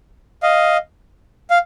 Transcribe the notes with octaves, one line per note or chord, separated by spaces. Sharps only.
D#5 F5
F5